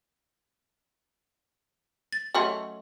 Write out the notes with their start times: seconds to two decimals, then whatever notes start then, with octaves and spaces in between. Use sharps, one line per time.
2.13 A6
2.35 F#3 A3 C#4 D#5 F#5 C6